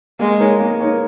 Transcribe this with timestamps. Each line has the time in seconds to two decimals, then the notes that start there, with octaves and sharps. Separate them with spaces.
0.19 G#3 A#3
0.39 D#4 A#4 C#5
0.60 A#3
0.81 D#4 A#4 C#5